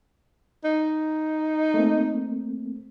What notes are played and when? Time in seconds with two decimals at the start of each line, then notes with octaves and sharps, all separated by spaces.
0.64 D#4
1.74 A3 A#3 C4